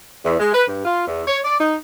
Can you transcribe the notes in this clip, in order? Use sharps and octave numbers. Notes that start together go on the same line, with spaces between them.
E2
G#3
B4
G2
F4
E2
C#5
D5
D#4